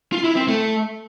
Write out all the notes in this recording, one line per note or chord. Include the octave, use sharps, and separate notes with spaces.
F4
E4
C4
A3